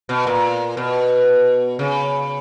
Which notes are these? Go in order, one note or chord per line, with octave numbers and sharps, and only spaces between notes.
B2
A#2
B2
C#3